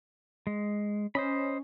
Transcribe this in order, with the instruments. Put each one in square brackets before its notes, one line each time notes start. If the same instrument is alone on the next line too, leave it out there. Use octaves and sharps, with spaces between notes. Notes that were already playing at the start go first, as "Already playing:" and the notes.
[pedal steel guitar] G#3
[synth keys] C#4 [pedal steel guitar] C5 D#5 B5